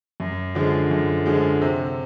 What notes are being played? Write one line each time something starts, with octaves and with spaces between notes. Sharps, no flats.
F#2
D3 F3 G#3
F#2
D3 F3 G#3
C3